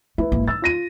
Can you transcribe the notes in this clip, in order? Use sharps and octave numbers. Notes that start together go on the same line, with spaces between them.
A3 E4 B4
G#1 A#3
D#3 E6 A6
F4 A#6 D#7